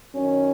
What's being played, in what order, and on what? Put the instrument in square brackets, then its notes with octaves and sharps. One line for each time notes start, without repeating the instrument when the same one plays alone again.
[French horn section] F#2 D#3 C#4